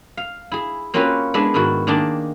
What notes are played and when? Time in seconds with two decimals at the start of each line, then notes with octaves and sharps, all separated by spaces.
0.17 F5
0.52 E4 G#4
0.94 A#3 C4 C#4 F4 F#4 B4
1.34 G#3 B3 D4 E4 E5
1.54 G#2 D#3 E4 F#4
1.87 D#3 A#3 D4 G#4 G5 A5